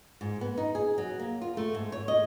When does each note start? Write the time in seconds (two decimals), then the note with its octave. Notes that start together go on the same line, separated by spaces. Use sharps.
0.21 G#2
0.41 B3
0.58 D#4
0.75 G#4
0.98 F#3
1.19 A#3
1.41 F4
1.57 A3
1.75 G#2
1.92 C#5
2.08 D#5